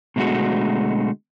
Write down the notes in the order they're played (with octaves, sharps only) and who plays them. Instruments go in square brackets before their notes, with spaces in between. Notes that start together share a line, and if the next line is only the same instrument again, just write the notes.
[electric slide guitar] B2 D3 G#3 A3 F#4